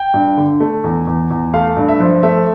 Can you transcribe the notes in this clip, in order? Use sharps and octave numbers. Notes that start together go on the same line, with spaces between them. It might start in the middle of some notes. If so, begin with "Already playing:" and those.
Already playing: G5
G2
D3
A3
E2
E2
E2
A3 F5
G2
E5
F3
A3 E5